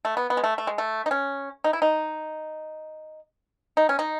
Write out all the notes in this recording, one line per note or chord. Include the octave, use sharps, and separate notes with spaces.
A3
B3
B3
G#3
A3
A3
G#3
A3
D#4
C#4
D#4
E4
D#4
D#4
C#4
D#4